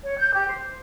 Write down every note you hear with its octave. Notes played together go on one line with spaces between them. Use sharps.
C#5
G6
G4
C5